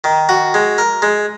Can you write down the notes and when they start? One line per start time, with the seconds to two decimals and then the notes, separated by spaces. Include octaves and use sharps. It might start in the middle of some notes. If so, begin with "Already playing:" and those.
0.04 D#3
0.29 F#4
0.54 G#3
0.78 A#4
1.02 G#3